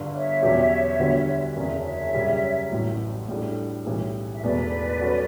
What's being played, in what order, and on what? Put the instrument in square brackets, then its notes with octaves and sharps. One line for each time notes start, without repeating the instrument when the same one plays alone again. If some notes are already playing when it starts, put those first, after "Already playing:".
Already playing: [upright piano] G1 G2 D3
[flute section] C#5 E5
[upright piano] E2 B2 F#3 C#4 G4
D2 D3 G3 B3 F#4
[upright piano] F#1 E2 C#3 [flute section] E5
[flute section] C#5 E5
[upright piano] F#2 C#3 G3
A1 A2 F#3
A2 G3 D4 F#4 A4
B1 A2 E3 G3 C#4
[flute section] E5
[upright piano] E1 E2 B2 A3 [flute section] B4 D5
[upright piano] F#3 C#4 F#4 A4